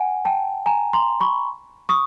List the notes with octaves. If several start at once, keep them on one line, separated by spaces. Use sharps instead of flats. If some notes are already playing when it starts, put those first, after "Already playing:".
Already playing: F#5 G#5
G5 A5
G#5 A#5
A#5 C6
B5 C#6
C#6 D#6